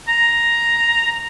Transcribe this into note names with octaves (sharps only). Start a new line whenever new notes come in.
A#5